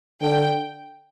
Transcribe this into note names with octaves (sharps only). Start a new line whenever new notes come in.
D3 G5